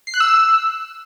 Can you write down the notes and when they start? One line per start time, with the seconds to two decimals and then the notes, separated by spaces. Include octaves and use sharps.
0.07 C7
0.14 F#6
0.20 E6